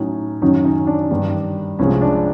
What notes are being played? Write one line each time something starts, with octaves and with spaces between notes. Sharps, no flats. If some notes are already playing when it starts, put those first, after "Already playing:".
Already playing: A2 F#3 C#4 D#4
F#2 D#3 F#3 C#4 D#4
C#4 D#4
D4
G2 D#3 G3 D4
C2 C3 F3 G#3 C#4
D4